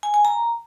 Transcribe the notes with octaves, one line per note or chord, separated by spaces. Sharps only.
G#5
G#5
A#5